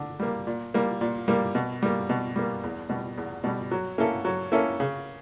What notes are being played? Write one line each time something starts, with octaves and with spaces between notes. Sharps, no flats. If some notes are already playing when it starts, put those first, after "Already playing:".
Already playing: D3
G3 A#3
A#2
G3 A#3
A#2
G3 A#3
B2
G3 A#3
B2
G3 A#3
E2
B2 G3
E2
B2 G3
F#3
A#3 C#4 E4 A4
F#3
A#3 C#4 E4 A4
C#3